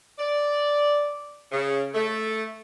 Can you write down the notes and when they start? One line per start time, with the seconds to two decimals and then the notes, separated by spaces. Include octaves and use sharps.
0.18 D5
1.52 C#3
1.95 A3